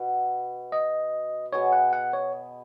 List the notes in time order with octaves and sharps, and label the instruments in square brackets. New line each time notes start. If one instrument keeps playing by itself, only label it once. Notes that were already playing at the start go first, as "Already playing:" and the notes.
Already playing: [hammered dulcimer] B2 B3 F#4 B4
[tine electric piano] D#5
[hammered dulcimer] B2 B3 G#4 B4 [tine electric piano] C#5
[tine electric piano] F#5
F#5
C#5